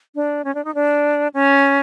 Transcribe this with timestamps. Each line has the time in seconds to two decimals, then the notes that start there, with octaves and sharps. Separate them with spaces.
0.15 D4
0.44 C#4
0.55 D4
0.65 D#4
0.75 D4
1.34 C#4